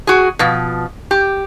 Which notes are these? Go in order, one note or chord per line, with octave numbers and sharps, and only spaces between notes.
F#4 G#4
B2 F3
G4